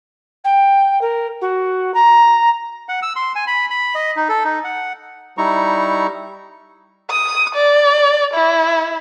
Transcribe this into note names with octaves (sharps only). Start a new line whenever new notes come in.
G5
A#4
F#4
A#5
F#5
E6
C6
G#5
B5
B5
D#5
D#4
A4
D#4
F#5
G3 D#4 E4 A#5 C#6
D#6
D5
E4